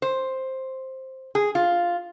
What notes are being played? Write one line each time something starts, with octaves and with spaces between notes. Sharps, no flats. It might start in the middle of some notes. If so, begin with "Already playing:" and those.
C5
G#4
F4